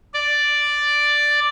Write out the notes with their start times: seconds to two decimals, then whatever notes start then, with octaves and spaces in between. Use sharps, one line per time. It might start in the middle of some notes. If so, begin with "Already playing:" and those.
0.14 D5